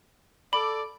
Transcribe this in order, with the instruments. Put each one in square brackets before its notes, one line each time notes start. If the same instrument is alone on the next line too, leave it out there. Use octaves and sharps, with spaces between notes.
[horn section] A4 D5 [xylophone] B5